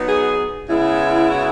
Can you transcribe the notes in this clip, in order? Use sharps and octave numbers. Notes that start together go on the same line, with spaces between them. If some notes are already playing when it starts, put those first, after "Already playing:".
Already playing: F#3 B3 D#4
G#4
C#3 G#3 B3 E4
F#4